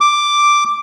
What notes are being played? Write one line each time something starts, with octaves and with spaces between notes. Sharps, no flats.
D6